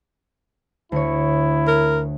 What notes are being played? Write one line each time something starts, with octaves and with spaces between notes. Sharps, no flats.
D2 E4 C#5
A#4